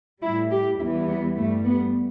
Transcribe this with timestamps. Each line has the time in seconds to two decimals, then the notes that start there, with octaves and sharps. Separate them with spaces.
0.21 A2 G3 E4
0.50 G4
0.79 E2 E3 G3 E4
1.07 B3
1.36 G2 G3 A3
1.64 B3